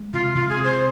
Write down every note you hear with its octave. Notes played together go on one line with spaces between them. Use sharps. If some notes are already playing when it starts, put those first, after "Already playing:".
Already playing: G#3
C3 F4
C3 F4
G#4
C4
C5